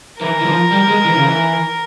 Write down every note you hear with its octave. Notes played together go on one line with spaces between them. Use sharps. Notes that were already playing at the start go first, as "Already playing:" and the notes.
E3 A#4
E3
F3
G3
G#3
E3
C#3
E3